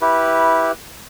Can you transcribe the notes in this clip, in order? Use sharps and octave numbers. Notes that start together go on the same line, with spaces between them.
E4 G4 B4